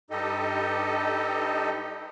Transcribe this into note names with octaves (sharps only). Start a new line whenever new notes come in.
G2 G3 D#4 G4 A4 D#5